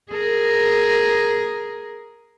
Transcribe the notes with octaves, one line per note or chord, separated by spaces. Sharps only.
G#4 A#4